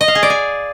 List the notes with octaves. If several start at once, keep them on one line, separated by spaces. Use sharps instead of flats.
D#5
F5
G#4
D5
G#5